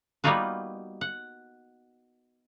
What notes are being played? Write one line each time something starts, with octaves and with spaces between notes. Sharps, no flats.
G3 A#3 B3 D#4 F4 F#4
F#5